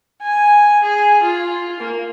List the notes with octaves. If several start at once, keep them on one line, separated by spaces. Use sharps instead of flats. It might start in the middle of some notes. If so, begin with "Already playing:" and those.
G#5
G#4
F4
A#3